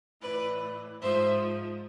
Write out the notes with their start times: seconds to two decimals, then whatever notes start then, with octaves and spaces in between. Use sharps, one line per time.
0.21 A2 E3 B4 D5
1.00 G#2 F3 C5 E5